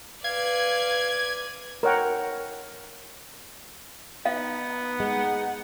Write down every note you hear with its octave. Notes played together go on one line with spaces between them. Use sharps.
B4 D5 F5 G#6
A#4 C#5 F#5 G5
B3 D#4 F5
G#3 D#4 F#5